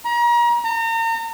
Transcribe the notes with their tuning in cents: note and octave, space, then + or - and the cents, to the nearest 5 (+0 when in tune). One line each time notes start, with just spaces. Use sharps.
A#5 +35
A#5 -35